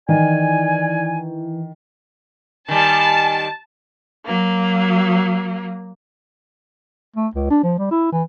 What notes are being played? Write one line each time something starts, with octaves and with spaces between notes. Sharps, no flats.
D#3 E3 D5 G#5
D#3 G3 G#5 A5
F#3 A#3
A3
C#2
D4
F3
G3
E4
E3